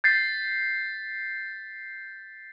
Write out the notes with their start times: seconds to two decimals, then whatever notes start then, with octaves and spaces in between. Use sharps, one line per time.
0.04 G6 A6 B6 C7